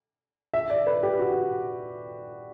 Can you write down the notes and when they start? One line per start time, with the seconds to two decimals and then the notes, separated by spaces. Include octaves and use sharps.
0.54 E5
0.70 D5
0.87 B4
1.03 G4
1.19 F#4